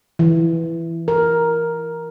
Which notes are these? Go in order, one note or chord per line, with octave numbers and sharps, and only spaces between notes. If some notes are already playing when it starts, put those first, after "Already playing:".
E3
A#4